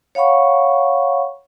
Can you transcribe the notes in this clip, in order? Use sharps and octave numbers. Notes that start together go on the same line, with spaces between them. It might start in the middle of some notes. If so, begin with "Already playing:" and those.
C#5 F5 F#5 B5 C#6